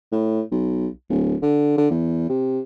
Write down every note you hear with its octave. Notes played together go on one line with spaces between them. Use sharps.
A2
B1
D1
D3
D3
E2
C3